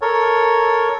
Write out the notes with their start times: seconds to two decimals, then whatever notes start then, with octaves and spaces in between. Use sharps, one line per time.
0.01 A4 A#4 C#5